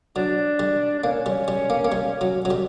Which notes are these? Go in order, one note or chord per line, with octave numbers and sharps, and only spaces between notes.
F#3 D4
G3
D4
A#3 C#4
G3
G3
A#3
A#3
G3
F#3
F#3
G3